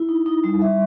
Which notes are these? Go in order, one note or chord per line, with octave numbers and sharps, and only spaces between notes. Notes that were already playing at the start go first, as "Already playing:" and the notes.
Already playing: E4
D#4
D#4
G3
E5